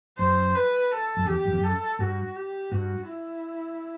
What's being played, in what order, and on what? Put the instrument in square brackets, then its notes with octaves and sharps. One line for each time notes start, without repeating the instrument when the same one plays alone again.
[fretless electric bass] F#2 [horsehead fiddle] C5
[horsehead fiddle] B4
A4
[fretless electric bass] F#2
[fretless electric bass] E2 [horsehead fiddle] G4
[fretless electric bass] F#2
E2
[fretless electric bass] F#2 [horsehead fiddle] A4
[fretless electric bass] G2 [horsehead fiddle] F#4
[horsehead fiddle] G4
[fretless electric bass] G2 [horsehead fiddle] F#4
[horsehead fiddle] E4